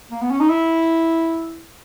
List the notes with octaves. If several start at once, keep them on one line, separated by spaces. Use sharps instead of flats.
A#3
B3
C#4
D#4
E4